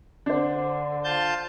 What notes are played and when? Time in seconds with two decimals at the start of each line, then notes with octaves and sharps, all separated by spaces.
0.26 D3 D4 C5
1.04 F4 A5 G6